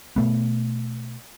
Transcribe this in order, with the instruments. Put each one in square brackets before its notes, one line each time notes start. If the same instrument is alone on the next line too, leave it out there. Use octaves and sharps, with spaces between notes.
[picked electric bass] B2 A3 B3